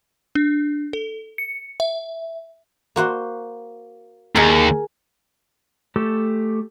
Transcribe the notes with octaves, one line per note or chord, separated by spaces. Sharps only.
D4
A4
C#7
E5
A#3 F#4 C5
D#2 G#4 A#4
A3 G4 A4